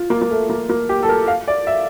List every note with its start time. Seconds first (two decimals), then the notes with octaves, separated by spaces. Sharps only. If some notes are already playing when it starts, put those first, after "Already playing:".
Already playing: F4
0.10 A#3
0.22 A#3
0.30 A3
0.50 A#3
0.69 A#3
0.89 G4
1.03 A4
1.09 A#4
1.27 F5
1.48 D5
1.67 E5